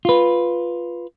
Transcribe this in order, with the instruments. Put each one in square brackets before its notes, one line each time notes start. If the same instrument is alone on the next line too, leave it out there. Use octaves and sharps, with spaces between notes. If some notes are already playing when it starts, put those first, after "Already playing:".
[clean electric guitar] F4 B4